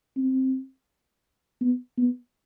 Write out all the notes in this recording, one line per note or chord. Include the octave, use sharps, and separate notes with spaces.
C4
B3
B3